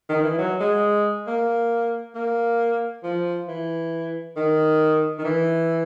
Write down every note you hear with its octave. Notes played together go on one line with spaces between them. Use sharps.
D#3
E3
F#3
G#3
A#3
A#3
F3
E3
D#3
D#3
E3